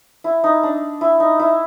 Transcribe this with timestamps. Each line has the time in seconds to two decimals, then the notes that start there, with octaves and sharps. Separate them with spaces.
0.24 E4
0.44 D#4
0.63 D4
1.01 E4
1.20 D#4
1.39 E4